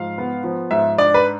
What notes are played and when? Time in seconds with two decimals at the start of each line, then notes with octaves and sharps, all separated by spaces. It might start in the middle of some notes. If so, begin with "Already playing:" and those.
Already playing: G#2 F3 F5
0.18 B3
0.44 F3
0.71 G#2 E5
0.98 D4 D5
1.14 B4